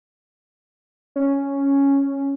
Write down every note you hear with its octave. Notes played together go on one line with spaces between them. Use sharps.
C#4